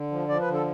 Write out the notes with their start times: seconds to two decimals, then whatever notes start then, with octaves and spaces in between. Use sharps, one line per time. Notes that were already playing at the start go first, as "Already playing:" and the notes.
Already playing: D3
0.11 F3
0.28 F3 D5
0.41 B4
0.47 D3
0.53 A4